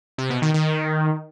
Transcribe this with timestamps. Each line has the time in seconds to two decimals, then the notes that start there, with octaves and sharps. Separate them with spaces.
0.18 C3
0.30 B2
0.42 D#3
0.54 D#3